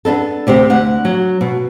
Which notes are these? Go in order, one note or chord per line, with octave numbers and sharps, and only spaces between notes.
B3 D4 D#4 A4
D2 C3 C4 G4
D2 F#5
F#3
B2